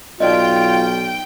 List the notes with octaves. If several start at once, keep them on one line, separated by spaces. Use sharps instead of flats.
B1 D#4 F4 D5 D#5 G5